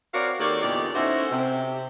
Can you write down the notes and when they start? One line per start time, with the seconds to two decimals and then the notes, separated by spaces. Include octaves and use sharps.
0.13 C4 F#4 A#4 C#5 D5 F5
0.39 D#3 A#3 G4 A4 C#5 D5
0.62 E2 A#2 D3 D#4 G4 D5
0.94 C#4 D#4 E4 F#4 A4 C5
1.31 C3